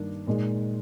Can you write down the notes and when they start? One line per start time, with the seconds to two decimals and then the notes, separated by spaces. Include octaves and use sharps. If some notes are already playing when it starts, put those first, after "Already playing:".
Already playing: G2 D#3 A#3 D4
0.27 A#2 G#3 D#4